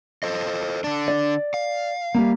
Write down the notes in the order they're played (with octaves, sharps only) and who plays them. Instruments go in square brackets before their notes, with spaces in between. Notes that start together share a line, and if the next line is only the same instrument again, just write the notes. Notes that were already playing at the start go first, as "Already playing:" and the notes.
[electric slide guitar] A4 C5 D#5
D3 D4
[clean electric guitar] D5
[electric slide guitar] F5
[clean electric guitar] G3 A#3